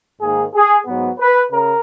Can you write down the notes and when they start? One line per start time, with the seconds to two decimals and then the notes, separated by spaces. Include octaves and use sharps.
0.21 G#2 D#3 A#3 G#4
0.54 G#4
0.86 G#2 F#3 B3
1.19 B4
1.52 C#3 A#4